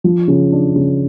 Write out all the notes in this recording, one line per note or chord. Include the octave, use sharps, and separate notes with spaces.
F3
C#3
D4
C#3